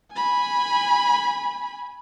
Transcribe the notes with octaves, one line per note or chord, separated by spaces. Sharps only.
G#5 B5